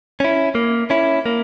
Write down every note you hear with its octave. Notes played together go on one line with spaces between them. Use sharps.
C#4 E4
A#3
C#4 E4
A#3